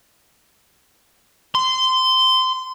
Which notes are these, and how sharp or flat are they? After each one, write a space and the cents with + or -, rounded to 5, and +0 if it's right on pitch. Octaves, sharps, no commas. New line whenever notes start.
C6 -20